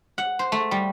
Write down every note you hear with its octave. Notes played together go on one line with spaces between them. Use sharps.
F#5
C5
A3
G3